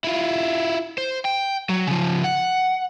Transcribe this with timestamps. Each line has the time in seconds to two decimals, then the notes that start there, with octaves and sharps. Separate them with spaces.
0.04 E4 F4
0.98 C5
1.25 G5
1.69 F#3
1.87 C#3 F3
2.24 F#5